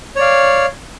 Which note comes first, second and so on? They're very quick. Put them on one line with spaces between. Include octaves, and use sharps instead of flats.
C#5 D5 F5